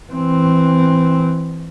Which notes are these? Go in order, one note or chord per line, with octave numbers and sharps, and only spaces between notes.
E3 C4